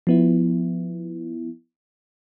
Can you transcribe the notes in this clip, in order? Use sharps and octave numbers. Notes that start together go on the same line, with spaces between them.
F3 B3 E4